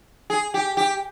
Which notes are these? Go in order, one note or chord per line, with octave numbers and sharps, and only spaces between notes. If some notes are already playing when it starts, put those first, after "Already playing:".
G#4
G4
G4